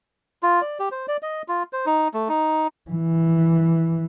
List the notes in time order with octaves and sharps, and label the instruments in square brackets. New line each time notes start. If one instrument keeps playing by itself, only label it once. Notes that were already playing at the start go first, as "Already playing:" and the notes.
[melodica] F4
D5
G4
C5
D5
D#5
F4
C5
D#4
A3
D#4
[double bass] E3